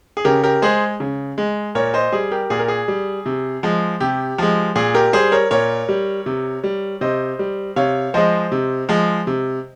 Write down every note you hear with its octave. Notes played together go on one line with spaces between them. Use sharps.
G#4
C#3 G4 A#4
G4 A#4
G#3 G#4 C5
C#3
G#3
A#2 A#4 C#5
C5 D#5
G3 G#4
G4 A#4
A#2 G#4
A#4
G#4
G3
C3
F3 G#3
C3 G4
F3 G#3
A#2 G#4
G4 A#4
G3 G#4 C5
A#4 C#5
A#2 A#4 C#5
G3
C3
G3
C3 C5 D#5
G3
C3 C#5 F5
F3 G#3 C5 D#5
C3
F3 G#3
C3